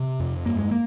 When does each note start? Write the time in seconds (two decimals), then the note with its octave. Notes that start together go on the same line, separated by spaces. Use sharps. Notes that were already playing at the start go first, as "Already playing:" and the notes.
Already playing: C3
0.20 F2
0.45 G2 A#3
0.59 G#3
0.71 A#3